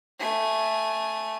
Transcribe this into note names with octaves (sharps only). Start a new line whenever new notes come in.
A3 G#5